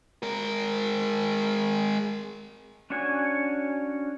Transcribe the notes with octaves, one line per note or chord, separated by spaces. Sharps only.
G#3 A#4
C#4 D4 F#4 C#5 G#5